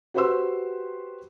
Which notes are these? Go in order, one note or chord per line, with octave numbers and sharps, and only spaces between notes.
F#4 G4 B4 C5 C6 E6